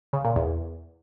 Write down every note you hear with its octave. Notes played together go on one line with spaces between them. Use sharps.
C#3
A#2
E2